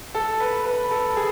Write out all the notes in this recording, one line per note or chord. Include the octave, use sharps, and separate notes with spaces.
A4
B4
B4
A4
G#4